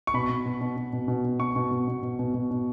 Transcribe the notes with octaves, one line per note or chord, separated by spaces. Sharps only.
C#6
B2 B5
B2
B2
B2
B2
B2
B2
B2
B2 C#6
B2
B2
B2
B2
B2
B2
B2